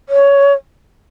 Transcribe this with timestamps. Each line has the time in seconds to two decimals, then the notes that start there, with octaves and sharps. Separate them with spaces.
0.09 C#5